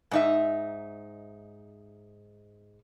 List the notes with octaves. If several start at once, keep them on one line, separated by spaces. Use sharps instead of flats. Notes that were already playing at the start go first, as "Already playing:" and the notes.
G#2 D#4 E5